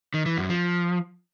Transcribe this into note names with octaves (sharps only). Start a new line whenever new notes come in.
D#3
E3
F#2
F3